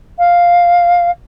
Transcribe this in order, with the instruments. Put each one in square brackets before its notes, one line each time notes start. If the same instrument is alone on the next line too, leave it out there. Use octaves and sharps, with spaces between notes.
[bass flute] F5